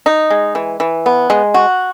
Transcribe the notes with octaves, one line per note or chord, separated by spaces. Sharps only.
D#4
G#3
E3
E3
B3
G#3
F#4